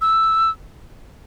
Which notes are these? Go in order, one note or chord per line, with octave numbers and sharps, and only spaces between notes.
E6